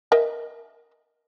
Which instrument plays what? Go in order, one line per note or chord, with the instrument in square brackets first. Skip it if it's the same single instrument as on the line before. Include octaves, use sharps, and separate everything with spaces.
[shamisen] A#4 D#5 E5